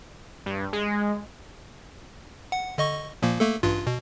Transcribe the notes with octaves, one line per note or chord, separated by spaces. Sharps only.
G2
G#3
F#5
D3 D#5 C#6
A#2 F3 A#3
A3 A#3 A4
A1 G2 F4
B2